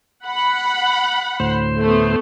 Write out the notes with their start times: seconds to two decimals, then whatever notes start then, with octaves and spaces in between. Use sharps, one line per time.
0.25 F#5 B5
1.40 D2 A2 C5
1.78 A3 B3